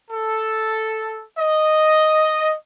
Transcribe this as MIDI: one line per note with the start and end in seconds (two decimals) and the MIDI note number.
0.10 1.23 69
1.38 2.55 75